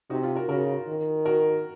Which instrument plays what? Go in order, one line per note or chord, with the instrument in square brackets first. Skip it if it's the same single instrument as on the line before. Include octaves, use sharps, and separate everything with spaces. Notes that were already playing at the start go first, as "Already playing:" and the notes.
[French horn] C3 [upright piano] D#4 F#4
[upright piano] F4
F#4 A#4
[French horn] C#3 [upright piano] F#4 A#4
[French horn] D#3
[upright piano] F#4 A#4